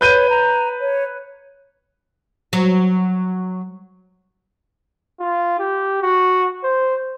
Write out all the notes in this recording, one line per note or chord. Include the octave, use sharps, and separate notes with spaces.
B4 C#5 G6 D#7
A#5
C#5
F#3
F4
G4
F#4
C5